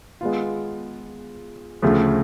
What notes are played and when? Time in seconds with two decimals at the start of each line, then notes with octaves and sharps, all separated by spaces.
0.21 G#3 B3 F4
1.82 D2 C#3 F3 A3